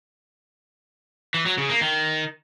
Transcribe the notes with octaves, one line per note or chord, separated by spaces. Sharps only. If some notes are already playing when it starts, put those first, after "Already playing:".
E3
F#3
C#3
A#3
D#3